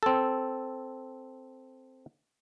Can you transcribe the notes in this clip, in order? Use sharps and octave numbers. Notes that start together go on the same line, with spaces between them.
C4 A4